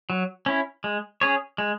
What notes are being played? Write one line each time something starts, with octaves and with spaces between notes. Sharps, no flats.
F#3
C#4 E4
G#3
C#4 G#4 C#5
G#3